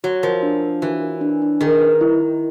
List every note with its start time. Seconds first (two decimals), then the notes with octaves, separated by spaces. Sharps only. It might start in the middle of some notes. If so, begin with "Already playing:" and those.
0.04 F#3 F#4
0.23 F3 A#4
0.43 D4
0.62 D4
0.82 E3 F#4
1.01 A#4
1.21 D4
1.42 D4
1.61 D#3 G#4
1.81 B4
2.01 E4
2.21 E4